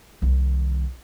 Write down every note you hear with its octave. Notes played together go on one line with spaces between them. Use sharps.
C2 D#3